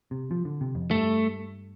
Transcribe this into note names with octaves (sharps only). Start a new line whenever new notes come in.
C3
F3
D3
C3
F2
G2 A3